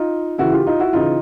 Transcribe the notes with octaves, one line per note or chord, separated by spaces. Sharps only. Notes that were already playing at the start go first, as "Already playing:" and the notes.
Already playing: D#4 F4
C#3 E3 E4 F#4
F4 G4
D#4 F4
E4 F#4
C#3 E3 D#4 F4